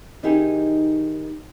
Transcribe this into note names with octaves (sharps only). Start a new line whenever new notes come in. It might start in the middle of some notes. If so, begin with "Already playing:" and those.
D#3 D#4 E4 G4 G#4